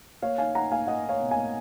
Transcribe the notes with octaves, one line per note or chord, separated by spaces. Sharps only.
A#3 C#5 F5
D#4 F5 G#5
D#4 F#5 A#5
A#3 F5 G#5
A#3 D#5 F#5
D#4
C#5 F5
B2
A#3 F5 G#5